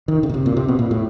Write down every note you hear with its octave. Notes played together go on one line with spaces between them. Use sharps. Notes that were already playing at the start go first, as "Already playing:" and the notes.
D#3
C#3
B2
C3
A#2
C3
B2
A#2
A2